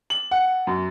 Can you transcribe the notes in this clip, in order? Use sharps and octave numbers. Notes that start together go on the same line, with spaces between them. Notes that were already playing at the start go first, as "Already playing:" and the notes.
F#7
F#5
F#2